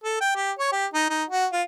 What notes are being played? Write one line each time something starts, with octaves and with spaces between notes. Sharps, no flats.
A4
G5
G4
C#5
G4
D#4
D#4
F#4
F4